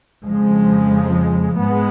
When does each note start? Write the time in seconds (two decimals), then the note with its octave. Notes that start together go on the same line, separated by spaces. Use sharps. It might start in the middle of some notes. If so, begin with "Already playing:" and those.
0.25 F2 C#3 F3 G#3
1.58 G#2 G#3 B3